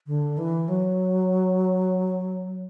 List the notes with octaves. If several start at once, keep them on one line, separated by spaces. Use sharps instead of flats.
D3
E3
F#3